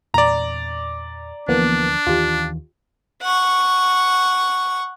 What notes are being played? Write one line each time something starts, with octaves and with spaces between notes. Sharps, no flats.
E2 A#2 D5 A#5
D2 E3 F3 A#3 B3 D4
D#2 D#3 E3 F4 G4
F#5 C#6